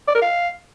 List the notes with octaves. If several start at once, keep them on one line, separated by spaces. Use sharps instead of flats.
D5
A#4
F5